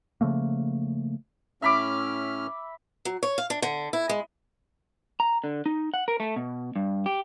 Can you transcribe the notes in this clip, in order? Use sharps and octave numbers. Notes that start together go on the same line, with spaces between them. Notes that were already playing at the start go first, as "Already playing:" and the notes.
C#3 F3 A3 A#3
A2 C#4 E5 B5 D6 F6
F#3
C#5
F5
D4
D3
E4
G#3
A#5
D3
D#4
F#5
A#4
A3
B2
G2
G4